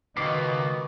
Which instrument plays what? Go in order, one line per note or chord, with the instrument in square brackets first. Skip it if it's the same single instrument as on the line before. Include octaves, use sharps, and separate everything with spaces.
[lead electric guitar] C#2 [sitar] B2 [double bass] D#3 [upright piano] D6 B6 C7